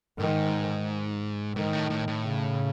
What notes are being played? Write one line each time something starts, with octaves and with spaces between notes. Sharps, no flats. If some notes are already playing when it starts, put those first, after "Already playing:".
G#2 D#3
G#2 D#3
A2
A2
A2
C#3